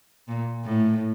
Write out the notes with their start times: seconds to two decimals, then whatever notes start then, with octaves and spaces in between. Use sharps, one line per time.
0.28 A#2
0.64 A2